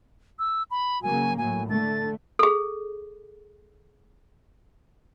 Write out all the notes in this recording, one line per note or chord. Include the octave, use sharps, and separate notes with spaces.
E6
B5
C#3 F#3 A#3 G#5
A2 F#3 G#5
D3 A3 A6
G#4 A4